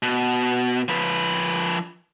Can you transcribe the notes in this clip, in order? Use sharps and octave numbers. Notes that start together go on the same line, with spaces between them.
B2
F3 B4